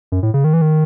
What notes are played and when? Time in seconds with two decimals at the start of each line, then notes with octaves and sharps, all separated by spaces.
0.12 F#2
0.23 A2
0.34 C#3
0.44 D#3
0.53 E3
0.62 D#3